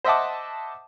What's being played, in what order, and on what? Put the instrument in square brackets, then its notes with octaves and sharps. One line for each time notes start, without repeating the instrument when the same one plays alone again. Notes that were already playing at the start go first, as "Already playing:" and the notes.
[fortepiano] C5 D#5 E5 F#5 A5 D6